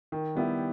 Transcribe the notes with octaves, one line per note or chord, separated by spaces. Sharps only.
D#3
G3 B3 E4 G4